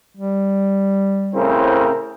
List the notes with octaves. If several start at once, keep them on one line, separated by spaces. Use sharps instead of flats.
G3
A2 C#3 C4 E4 A#4 C5